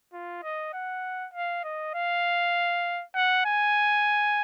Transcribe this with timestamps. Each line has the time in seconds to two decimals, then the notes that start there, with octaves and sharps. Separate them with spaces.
0.13 F4
0.43 D#5
0.73 F#5
1.34 F5
1.64 D#5
1.94 F5
3.15 F#5
3.45 G#5